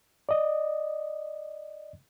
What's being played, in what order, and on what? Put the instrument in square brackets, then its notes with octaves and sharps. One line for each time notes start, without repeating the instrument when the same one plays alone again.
[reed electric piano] D5 D#5